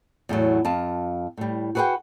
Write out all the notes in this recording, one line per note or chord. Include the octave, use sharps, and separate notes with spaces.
E2 A2 F#3
F2 F4 A5
A2 G3
F#4 G#4 B4 D5 F#5 G5